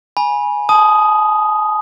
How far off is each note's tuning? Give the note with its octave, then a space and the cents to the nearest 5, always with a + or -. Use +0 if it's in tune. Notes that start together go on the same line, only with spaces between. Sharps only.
G#5 +0 B5 -25
A5 -40 D#6 +0